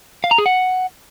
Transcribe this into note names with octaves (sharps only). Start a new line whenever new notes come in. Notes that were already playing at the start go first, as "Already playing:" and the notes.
F5
A#5
G#4
F#5